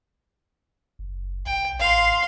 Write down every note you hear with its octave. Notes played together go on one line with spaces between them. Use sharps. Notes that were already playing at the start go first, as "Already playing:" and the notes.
F#1
B1 G5
A1 F5 C6